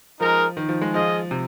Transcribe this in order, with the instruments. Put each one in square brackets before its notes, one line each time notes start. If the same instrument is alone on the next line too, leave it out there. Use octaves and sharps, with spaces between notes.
[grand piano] F3 [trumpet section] G#3 D#4 A#4
[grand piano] D#3
F3
G#3
[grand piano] F3 [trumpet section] G#3 F4 G#4 D#5
[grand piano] C3